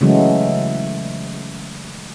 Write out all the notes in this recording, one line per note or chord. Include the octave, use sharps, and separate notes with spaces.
C#3 E3 F#3 G#3 A3